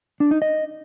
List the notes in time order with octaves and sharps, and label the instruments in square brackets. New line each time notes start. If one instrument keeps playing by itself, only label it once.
[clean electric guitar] D4
D#4
D#5